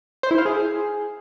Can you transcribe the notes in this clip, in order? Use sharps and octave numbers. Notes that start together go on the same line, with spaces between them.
C5
E4
F5
G#4